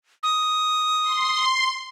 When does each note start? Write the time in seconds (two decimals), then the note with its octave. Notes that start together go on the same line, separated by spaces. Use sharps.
0.23 D#6
1.02 C6